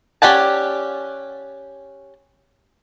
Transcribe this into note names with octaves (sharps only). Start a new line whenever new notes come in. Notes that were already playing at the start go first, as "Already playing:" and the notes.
C#4 G4 D5 F#5 A5